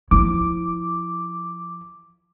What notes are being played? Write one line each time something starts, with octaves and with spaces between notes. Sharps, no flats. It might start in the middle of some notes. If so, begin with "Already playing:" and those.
F3 E4 D6